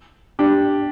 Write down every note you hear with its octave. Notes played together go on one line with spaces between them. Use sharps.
D4 G4